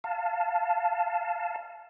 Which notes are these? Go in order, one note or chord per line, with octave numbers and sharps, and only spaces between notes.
F5 A5